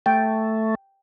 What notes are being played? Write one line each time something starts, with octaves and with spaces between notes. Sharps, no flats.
A3 G5